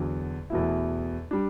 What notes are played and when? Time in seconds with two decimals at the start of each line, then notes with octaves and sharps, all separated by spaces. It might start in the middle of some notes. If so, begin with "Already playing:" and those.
Already playing: E2 D3 F#3
0.50 E2 B2 A3 E4
1.31 G3 D4